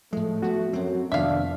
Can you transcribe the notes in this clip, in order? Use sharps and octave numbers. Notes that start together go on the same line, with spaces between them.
A2 F3 G#3 A3
F3 B3 F#4
F#2 F#3 C4
F2 C3 D#3 B3 D4 E5 F5